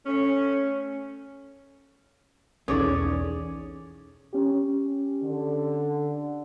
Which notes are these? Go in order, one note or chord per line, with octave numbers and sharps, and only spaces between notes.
A3 C#4
B1 E2 C#4 D#4 G#4 A4 C#5 D5
C#4 G4
D3